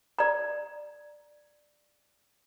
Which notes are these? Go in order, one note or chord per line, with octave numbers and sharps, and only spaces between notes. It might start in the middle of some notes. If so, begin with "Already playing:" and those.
D5 A#5